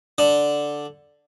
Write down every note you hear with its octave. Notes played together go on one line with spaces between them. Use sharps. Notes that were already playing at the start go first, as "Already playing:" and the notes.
D3